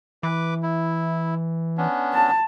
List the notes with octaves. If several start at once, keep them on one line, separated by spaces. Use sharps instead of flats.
E3 B4 D6
E4
B3 C#4 D4
A5